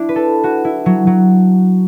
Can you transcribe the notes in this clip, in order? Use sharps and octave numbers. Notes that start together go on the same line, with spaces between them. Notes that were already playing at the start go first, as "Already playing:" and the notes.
Already playing: D4 E4
B4
A4
F#4
E4
F#3
F#3